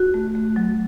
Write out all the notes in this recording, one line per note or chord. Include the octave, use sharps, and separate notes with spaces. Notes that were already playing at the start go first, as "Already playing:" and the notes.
Already playing: F#4
A3
A3
F#3